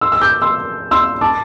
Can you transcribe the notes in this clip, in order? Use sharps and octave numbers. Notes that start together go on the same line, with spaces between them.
C6 E6
E6
D6 G6
C6 E6
C6 E6
A5 D6